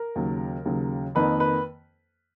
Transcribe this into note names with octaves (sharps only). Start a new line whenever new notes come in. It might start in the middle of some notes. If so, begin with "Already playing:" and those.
Already playing: A#4
D#2 C#3 F#3
D#2 C#3 F#3
F2 D#3 A#3 B4
B4